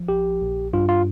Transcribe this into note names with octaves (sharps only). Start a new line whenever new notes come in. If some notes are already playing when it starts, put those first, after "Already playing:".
Already playing: F3
A#1 G4
A#1
G2 F4
F4